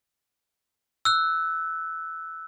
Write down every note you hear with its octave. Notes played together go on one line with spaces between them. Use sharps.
E6 F#6